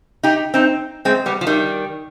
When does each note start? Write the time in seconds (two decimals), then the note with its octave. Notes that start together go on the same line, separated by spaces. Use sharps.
0.23 D#4 G4
0.54 C4 D#4
1.05 G#3 C4
1.26 G3 B3
1.41 F3
1.47 D#3 G3